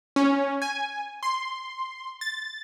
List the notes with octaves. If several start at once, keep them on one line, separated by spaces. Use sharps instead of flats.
C#4
G#5
C6
A6